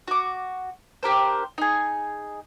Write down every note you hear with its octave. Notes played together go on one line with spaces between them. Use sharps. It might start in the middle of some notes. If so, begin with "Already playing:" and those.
F#4 D6
D4 G4 A#4 C5
D#4 G#4